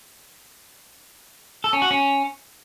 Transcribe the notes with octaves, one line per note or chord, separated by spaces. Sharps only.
A4
C#4
F#4
C#4